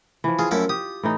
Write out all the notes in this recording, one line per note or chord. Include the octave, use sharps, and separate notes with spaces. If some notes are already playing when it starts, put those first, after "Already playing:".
E3 F3
F4 G#4
F#2 A3 E4
G4 D#6
A2 E3 D#4